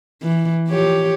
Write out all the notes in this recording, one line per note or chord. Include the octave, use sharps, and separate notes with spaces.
E3
F3 G4 C#5